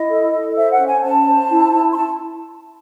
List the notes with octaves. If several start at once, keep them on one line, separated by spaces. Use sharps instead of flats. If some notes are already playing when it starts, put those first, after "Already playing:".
Already playing: E4 D#5
A4
A4
C5 E5
F#5
C#4
G#5
C#4 A5
C5
E4
E4
C6
E4 A5